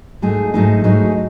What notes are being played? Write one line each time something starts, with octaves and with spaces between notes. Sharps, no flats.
G#2 F#3 A3 D#4 G#4
G#2 F#3 A3 D#4 G#4
G#2 F#3 A3 D#4 G#4